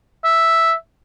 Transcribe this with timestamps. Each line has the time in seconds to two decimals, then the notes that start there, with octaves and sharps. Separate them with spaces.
0.24 E5